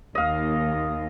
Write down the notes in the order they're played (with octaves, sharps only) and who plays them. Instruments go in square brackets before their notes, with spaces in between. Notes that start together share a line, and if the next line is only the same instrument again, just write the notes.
[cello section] D#2 [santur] D#5 F5